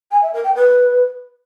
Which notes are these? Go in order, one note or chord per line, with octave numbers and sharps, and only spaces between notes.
G#5
E5
A#4
G5
B4